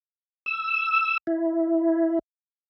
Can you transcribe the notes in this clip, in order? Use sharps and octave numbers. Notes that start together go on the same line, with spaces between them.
E6
E4